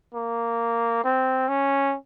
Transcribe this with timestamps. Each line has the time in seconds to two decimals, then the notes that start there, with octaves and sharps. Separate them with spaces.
0.14 A#3
1.04 C4
1.48 C#4